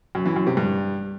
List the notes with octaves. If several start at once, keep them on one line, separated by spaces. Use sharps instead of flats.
F#2
E3
F#2
C3
G2